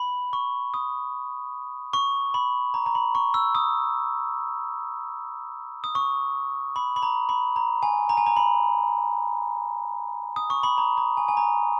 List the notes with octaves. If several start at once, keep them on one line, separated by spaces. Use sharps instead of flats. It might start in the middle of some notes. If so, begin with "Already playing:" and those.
Already playing: B5
C#6
D#6
C#6
B5
A#5
A#5
B5
C#6
E6
D#6
D#6
C#6
B5
B5
A#5
B5
A#5
G#5
A#5
G#5
A#5
B5
D#6
C#6
B5
A#5
A#5
G#5
G#5
A#5